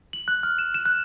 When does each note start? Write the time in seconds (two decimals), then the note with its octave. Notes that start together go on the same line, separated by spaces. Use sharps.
0.13 F#7
0.28 F#6
0.43 F6
0.59 E7
0.74 E7
0.86 F#6